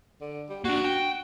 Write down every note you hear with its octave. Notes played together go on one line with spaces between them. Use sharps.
D3
G3
A#3 D4 F#4
G5